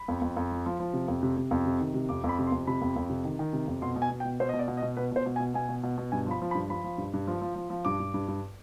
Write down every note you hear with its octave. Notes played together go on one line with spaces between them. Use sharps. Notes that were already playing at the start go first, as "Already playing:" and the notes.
Already playing: B5
F2
F2
F2
F3
F3
F3
C3
F2
C3
C3
F2
C3
D#3
C3
F2 D6
F2
B5
C3
C6
F2
C3 B5
F2
F2
C3
D#3
D#3
C3
F2
B2 C6
B2
G#5
B2
G5
B2
B2 C5
D#5
B2
D5
B2
D#5
B2
B2 B4
B2 C5
B2
G#5
B2
B2 G#5
B2
B2
B2
G2 G#5
F3 B5
F3
B5
G2
F3 B5
F3
G2
G2
F3
F3
F3
F3
G2 D6
G2
G2
G2